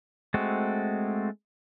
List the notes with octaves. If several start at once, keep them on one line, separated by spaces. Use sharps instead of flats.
G#3 A3 C4 F#4